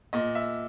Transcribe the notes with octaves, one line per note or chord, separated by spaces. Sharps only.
A#2 D#5
E5